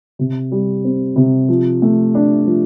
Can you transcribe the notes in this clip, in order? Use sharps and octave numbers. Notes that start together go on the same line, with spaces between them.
C3
G3
C4
C3
F3
A3
D4
F3